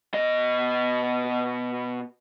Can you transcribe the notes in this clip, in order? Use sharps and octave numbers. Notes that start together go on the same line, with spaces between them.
B2 D#5